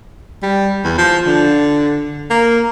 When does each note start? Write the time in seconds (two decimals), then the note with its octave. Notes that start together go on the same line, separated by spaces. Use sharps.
0.43 G3
0.84 E2
0.98 F3
1.27 D3
2.31 A#3